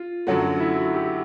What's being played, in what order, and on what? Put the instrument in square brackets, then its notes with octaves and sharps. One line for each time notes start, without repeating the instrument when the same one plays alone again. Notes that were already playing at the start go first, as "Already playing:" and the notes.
Already playing: [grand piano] F4
[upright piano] F#2 D3 F#3 A3 [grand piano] F#4
[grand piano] F#4
E4
F#4
G4